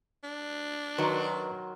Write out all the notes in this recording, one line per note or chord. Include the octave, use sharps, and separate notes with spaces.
D4
D#3 F#3 F#4 A#4 B4 D#5 A#5 C6